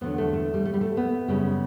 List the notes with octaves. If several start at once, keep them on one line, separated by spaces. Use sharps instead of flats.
E2 D3 F#3 B3
A3
A3
G3
A3
G3
A3
B3
F#2 C#3 G3